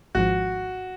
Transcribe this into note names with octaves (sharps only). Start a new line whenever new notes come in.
G#1 G#2 F3 F#4